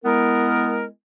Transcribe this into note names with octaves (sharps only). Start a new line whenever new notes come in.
G#3 B3 E4 A#4